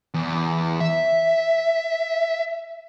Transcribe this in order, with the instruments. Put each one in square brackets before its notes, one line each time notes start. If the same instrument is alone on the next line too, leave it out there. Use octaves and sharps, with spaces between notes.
[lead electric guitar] E2
E5